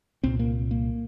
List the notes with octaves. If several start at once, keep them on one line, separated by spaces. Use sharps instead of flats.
C2 A#2 C4
A#3
A#3